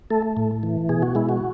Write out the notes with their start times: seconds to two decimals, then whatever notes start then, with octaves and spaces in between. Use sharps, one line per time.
0.10 A3 A4
0.37 A2
0.63 E3
0.89 B2 G#4
1.02 F#4
1.15 G#3 E4
1.29 F#4